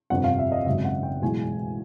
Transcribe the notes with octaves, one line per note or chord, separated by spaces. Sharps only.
G1 F2 C3 F#5
F5
E5
D#5
G#1 F#2 C#3 E5
F#5
G5
B1 A2 E3 G#3 G#5